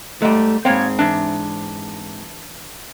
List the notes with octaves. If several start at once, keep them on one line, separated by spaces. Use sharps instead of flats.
G#2 G3 A3
G#2 A#3 C4 C#5 G5
E3 D4